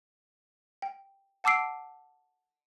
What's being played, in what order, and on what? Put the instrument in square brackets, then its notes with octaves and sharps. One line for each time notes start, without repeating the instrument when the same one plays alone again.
[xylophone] G5
F#5 A5 D6 E6 C7 D7